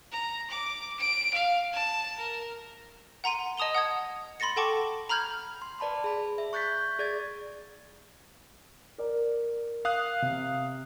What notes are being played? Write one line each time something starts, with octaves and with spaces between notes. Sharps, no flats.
A#5
D6
D7
F5
A5
A#4
F#5 A#5 C6 D#7
D#5 A5 D#6 F7 G7
F#5 D#6 G#6
B5 C6 A6 A#6 C#7
A4 F#5 G5 A5 C#6 D6
A#5 B5 F6 G6 G#6
C6
B4 D5 A5 B5 C6
G#4 B5
E5
C#6 F#6 G6 A6 B6
G#4 D5 G#6 A6
A#4 D5
F5 D#6 F#6
C3